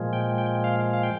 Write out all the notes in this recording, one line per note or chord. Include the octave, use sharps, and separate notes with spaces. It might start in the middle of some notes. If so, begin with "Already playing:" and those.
Already playing: A#2 F3 G#3
G5
G5
F5
F5
G5